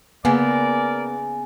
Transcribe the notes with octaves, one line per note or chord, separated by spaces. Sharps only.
C#3 A#3 B3 A#4 D5